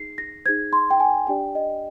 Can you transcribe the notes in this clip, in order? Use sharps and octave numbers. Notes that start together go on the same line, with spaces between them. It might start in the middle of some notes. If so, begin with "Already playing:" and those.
Already playing: D#4 G#4 C7
A#6
D#4 G#4 C5 G#6
C6
G5
G#5
D4 G4 D5 G5
D#5